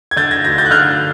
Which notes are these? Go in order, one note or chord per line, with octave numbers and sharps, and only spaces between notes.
G#6
D3 G6 A6
G#6 A#6
D2 G#6 A#6
G6 A6
F#6
D3 F6 G6